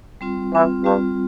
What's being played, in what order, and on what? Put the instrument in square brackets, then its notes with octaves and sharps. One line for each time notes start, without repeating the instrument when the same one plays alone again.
[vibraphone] G3 C4 F4
[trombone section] E3 [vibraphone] G3 C4 F4
[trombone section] G2 [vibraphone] G3 C4 F4